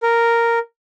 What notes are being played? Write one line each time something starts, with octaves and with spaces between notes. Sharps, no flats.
A#4